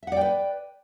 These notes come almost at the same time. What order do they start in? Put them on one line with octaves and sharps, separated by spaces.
E5 F#5 D5 G5 B4